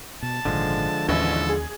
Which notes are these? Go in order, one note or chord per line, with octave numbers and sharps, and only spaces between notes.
B2 A5
G#1 A#2 D3 D#3 F3 G#3
A1 D#2 E3 G3 C#4 A4
G#4